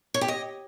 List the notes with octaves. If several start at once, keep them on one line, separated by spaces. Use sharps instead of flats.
C#5
G4
D#5